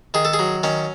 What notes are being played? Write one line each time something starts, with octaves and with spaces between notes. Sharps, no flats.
D#3 G#4
A4
G#4
F#3
D#3 C#4